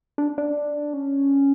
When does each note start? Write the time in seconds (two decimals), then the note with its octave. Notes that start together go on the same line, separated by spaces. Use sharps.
0.18 D4
0.38 D4
0.94 C#4